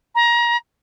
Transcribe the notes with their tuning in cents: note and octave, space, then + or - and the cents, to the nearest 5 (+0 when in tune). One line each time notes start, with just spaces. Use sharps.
A#5 +25